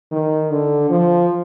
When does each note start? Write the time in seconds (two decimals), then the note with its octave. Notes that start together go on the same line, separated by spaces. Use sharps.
0.12 D#3
0.51 D3
0.90 F3